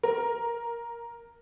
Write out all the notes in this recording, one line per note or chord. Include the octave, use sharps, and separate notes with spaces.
A#4